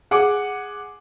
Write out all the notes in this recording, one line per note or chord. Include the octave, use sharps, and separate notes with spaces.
G#4 F#5 D6